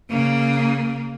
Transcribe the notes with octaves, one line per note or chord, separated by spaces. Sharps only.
C#3 A#3